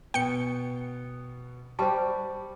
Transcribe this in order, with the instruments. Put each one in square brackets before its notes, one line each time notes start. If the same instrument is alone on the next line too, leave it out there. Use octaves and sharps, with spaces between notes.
[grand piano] B2 B3 [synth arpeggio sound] G5 C#7
[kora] G3 G4 [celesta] C5 A5 [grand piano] D5 C#6